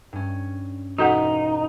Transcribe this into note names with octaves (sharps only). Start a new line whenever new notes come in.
G2 C#4
E1 D#4 F#4 A4 B4 F#5 B6